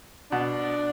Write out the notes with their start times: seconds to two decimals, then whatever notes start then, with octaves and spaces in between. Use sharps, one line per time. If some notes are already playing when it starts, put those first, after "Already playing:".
0.31 B2 D4